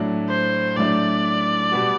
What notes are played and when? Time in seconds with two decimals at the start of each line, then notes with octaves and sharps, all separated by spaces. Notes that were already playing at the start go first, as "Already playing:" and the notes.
Already playing: A2 F#3 A3 D4
0.29 C5
0.77 A2 F#3 A3 D4 D5
1.71 B2 G3 B3 F#4